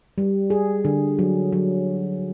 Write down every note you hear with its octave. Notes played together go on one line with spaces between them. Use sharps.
G3
G#4
D3
F#3
F#3